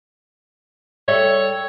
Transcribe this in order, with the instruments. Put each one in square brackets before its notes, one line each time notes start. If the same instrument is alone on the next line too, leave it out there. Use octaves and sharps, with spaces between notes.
[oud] G3 A4 E5 [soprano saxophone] C#5